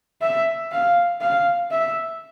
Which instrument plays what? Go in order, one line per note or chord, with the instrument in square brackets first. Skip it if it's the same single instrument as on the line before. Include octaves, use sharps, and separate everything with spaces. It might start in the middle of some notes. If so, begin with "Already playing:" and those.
[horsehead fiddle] E5
F5
F5
E5